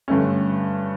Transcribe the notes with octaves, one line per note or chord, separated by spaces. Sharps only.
G2 D3 A3 C#4